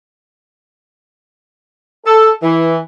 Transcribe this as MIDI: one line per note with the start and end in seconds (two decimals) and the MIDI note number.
2.05 2.30 69
2.43 2.77 52